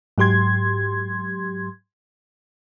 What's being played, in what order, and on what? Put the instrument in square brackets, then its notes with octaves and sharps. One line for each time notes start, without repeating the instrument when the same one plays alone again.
[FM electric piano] G#2 F#3 G4 C6 G#6